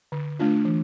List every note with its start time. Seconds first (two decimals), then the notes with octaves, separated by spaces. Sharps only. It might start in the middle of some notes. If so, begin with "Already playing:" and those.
0.12 D3
0.39 A3 D4 F4
0.65 E3